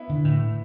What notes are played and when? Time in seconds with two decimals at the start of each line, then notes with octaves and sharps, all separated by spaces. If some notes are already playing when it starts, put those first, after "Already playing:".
Already playing: B3 E4 E5
0.10 D3
0.24 A2